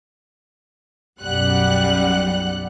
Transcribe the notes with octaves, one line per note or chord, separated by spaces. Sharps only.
B1 F#2 G3 F#5 F#6